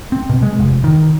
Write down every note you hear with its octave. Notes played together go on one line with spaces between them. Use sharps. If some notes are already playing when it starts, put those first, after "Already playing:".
C4
B2
G#3
F1
D#3